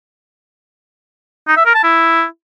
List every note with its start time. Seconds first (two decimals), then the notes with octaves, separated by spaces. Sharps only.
1.48 D#4
1.57 E5
1.66 A#4
1.74 A5
1.83 E4